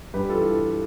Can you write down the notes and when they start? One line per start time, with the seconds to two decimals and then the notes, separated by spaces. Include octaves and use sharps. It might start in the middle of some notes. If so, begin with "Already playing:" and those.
0.14 G2 G4 B4
0.29 F4 A4
0.35 E3